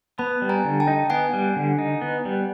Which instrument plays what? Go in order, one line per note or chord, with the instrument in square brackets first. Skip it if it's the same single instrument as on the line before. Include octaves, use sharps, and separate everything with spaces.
[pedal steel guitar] B3 [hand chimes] A5 B5
[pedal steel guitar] G3
[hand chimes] G#5 A#5
[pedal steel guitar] D3
[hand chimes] G5 A5
[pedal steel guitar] D#4
[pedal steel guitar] B3 [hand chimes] F#5 G#5
[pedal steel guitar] G3
D3
D#4
B3
G3